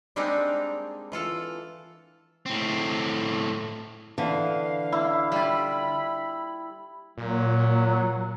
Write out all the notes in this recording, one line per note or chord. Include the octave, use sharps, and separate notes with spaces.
G3 G#3 A#3 C4 D4 D#4
E3 F4 A4
A2 C4
D3 E3 F5
A#3 E4
G3 F4 B5
A#2 F#3